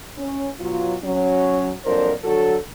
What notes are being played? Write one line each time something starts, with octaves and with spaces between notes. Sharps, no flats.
C#4
B2 F#3 F4
F#3 C#4
F2 A#2 F#3 D4 A#4 C5
D3 F#3 F#4 A4